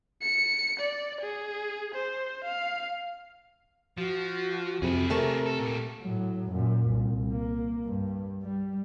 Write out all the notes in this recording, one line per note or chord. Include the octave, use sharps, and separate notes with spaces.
C#7
D5
G#4
C5
F5
F3 F#4
F2 C3 G#4 B4
C3 A3 A#4 A5 C#6
A4
A#2 G3
A2 F#3
F#2 A#2
C2
A#3
G2
G3